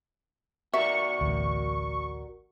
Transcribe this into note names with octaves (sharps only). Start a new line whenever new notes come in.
F#4 A#4 D5 E5 C#6
A1 D2